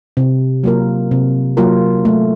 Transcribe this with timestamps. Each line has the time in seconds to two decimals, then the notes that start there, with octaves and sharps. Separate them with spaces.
0.17 C3
0.64 F#3 A#3 F4 A#4
1.11 C3
1.57 F#3 A#3 F4 A#4
2.05 A3